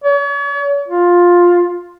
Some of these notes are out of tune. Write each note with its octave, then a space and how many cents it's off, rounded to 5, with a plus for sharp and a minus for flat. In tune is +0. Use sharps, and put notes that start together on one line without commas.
C#5 +40
F4 +10